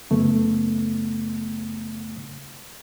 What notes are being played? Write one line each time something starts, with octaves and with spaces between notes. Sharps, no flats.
F#2 C#3 A3 B3